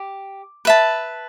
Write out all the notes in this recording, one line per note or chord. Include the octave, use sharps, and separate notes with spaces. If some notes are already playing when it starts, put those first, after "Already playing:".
Already playing: G4
B4 E5 A5